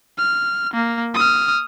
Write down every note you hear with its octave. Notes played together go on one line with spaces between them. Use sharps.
F6
A#3
D#6 F6